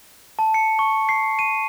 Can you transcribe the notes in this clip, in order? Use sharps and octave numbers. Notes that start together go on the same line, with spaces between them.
A5
C#7
C#6
C7
D#7